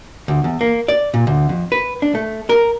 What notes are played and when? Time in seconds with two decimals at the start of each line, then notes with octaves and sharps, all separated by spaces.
0.28 D2
0.44 E2
0.61 A#3
0.88 D5
1.14 A#2
1.27 D2
1.49 F2
1.72 B4
2.02 D4
2.15 A3
2.49 A#4